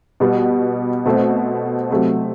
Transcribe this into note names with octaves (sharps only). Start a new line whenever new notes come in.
B2 G3 B3
B2 A3 C4
C3 F#3 A3 C4